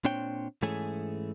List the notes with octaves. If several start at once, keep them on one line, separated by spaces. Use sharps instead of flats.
A#2 C4 D4 C#5 G5
G#2 E3 A3 C#4 G#4